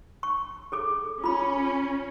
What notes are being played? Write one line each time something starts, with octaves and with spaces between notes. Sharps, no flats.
C#6
G#4 A4 D6
C#4 F4 B5